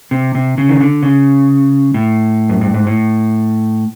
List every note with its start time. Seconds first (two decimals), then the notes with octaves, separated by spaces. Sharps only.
0.11 C3
0.35 C3
0.58 C#3
0.69 D#3
0.81 D3
1.02 C#3
1.94 A2
2.49 F#2
2.61 G2
2.74 G#2
2.87 A2